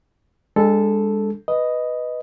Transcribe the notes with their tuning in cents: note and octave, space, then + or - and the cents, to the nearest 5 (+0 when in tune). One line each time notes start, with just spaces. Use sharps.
G#3 -30 D4 -10 A4 -5
B4 +0 D#5 +0